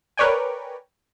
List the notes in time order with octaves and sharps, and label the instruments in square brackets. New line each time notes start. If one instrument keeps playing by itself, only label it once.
[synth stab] A#4 B4 C#5 D5 G5 G#5